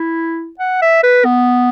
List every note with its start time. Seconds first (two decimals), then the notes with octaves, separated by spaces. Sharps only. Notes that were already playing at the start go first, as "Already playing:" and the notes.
Already playing: E4
0.60 F#5
0.82 E5
1.03 B4
1.25 B3